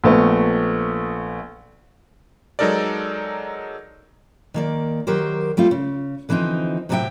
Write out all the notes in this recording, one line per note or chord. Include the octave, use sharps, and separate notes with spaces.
A#1 A3 B3
F#3 G#3 D#4 A4 A#4 D5
D#3 A#3 D5
D#3 F#3 G4 A#4 C5
G3 A3 C4 F4
C#3
D3 E3 F3 C4 D#4
A2 C3 F#3 A4 E5 G5